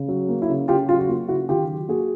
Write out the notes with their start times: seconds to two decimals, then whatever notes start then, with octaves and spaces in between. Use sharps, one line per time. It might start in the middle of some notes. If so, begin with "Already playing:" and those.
Already playing: C#3
0.08 F#3
0.29 A#3
0.42 E4
0.49 C#3
0.68 C#3 F4 G4
0.89 F#3 F4
0.99 F#4
1.08 A#3 F4
1.28 C#3 E4 F#4
1.49 D#3 F4 G4
1.69 F#3
1.89 A#3 F#4 G#4